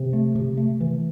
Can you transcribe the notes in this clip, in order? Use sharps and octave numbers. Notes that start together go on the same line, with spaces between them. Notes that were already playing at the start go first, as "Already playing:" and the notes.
Already playing: C3
A3
C3
A3
E3